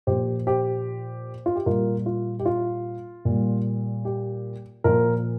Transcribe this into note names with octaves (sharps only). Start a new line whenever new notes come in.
A#2 F3 G4 C5
G4 C5
F4
G4
A#2 G3 F4 A#4
F4
G4
F4
A#2 G3
G4
A#2 F3 F4 A#4